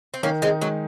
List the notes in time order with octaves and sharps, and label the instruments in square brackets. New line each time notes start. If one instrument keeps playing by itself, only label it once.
[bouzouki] C4
[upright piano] D#3 [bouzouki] A#3 C#4
[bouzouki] G#3 C4 [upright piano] D#4
[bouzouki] F#3 [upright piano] G#3